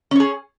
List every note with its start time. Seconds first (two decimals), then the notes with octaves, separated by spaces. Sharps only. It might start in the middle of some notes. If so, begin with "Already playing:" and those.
0.11 C#4
0.16 C#5
0.20 G#4